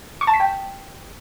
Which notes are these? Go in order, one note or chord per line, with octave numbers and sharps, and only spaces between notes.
C#6
A5
B6
G5